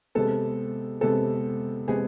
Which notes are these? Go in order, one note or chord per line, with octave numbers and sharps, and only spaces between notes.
C3 G#3 B3 A4
C3 G#3 B3 A4
C3 G#3 B3 G#4